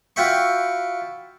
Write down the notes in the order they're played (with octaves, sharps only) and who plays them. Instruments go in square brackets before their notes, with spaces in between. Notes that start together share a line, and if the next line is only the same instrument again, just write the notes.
[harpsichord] F4 F#4 E5 G5 B5 C#6